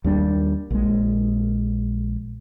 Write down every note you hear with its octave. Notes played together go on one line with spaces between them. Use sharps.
D#2 G3 D4
A#1 G#3